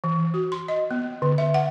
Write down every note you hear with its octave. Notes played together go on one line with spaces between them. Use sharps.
E3
F#4
C6
D#5
B3
D3
E5
F#5